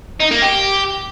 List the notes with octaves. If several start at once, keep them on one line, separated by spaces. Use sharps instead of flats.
D#4
A#3
G4